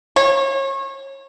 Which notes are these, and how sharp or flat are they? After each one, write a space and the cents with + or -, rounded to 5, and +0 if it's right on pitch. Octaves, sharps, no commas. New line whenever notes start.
C#5 -30